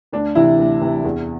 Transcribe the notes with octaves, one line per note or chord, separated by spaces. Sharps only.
D2 D4
C3 E3 E4
D2
C3 E3
E2